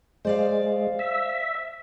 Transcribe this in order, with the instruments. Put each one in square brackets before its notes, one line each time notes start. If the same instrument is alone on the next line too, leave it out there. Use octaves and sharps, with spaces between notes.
[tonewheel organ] G#3 [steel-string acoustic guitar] C5 D5 F5
[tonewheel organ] E5